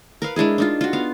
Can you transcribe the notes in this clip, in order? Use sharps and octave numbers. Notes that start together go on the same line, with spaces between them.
A#4 B4 F5
G#3 D4 E4 G#4
D4 D#4 F4
F4 F#4
B3 F5